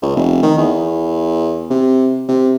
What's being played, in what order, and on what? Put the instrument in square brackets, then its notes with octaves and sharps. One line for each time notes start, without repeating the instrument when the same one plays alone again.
[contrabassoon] C#2
F1
D#3
E2
C3
C3